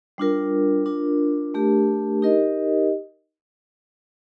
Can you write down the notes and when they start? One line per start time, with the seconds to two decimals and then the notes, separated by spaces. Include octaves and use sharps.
0.18 G3 D4 F4 A#4
0.86 D4 F4 A#4
1.54 A3 D4 G4 A#4
2.22 D#4 G4 A#4 D#5